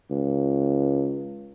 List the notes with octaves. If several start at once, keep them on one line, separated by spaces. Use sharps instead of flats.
C#2